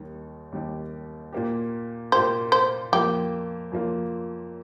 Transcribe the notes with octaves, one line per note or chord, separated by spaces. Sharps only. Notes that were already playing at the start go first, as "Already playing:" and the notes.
Already playing: D#2 D#3 G3 D#4
D#2 D#3 G3 D#4 G4
A#2 A#3 G4
A#2 A#3 G4 C5
C5
F2 F3 A#3 F4 G4
F2 F3 A#3 F4